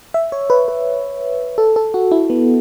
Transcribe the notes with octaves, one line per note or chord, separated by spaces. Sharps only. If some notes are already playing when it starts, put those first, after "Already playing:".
E5
C#5
B4
B4
A4
A4
F#4
E4
B3